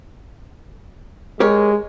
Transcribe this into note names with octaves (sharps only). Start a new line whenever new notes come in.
G#3 G4 A#4 C#5